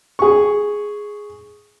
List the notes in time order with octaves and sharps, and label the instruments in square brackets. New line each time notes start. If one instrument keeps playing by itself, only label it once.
[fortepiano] G#4 C#6